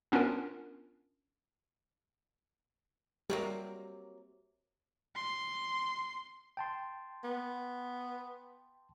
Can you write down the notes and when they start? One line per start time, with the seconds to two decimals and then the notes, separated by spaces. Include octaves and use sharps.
0.12 B3 C#4 D4 F4 A#4
3.30 C3 F#3 G3 A#3
5.16 C6
6.57 G5 A5 C6
7.24 B3